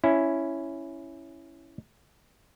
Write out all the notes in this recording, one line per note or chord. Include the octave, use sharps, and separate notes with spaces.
C#4 E4